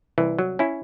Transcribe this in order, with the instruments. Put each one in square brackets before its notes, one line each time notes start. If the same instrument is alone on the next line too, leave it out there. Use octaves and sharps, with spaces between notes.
[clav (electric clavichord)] C2 E3
F#3
C#4 E4